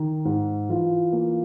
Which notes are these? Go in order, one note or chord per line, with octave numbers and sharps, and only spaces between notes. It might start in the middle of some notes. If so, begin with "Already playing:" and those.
Already playing: D#3
G#2
E3 F4
A#3